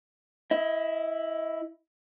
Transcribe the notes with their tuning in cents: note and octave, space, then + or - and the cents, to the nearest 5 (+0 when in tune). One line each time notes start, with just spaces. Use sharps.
E4 +0 D#5 +30